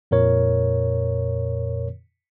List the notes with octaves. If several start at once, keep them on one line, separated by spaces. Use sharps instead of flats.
F2 A#2 A#4 C#5